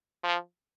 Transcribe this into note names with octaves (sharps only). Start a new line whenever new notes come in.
F3